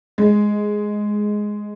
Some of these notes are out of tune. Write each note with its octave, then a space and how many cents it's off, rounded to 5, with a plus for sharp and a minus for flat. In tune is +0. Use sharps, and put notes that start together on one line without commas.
G#3 +5